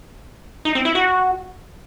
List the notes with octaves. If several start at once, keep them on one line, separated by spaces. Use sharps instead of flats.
D#4
C4
E4
F#4